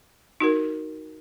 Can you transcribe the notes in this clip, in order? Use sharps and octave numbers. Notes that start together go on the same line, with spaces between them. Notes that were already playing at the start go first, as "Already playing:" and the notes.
D#4 F#4 A#4